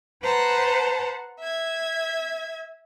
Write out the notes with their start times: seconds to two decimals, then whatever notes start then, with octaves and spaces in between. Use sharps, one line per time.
0.23 B4 C5 F#5 A5 A#5
1.40 E5 G#6